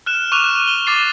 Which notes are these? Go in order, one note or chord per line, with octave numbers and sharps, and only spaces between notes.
F6 F#6 E7
C#6 D6 F6 F#6 F7
F#6
E7 G7
C#6 D6 A6 C7 G7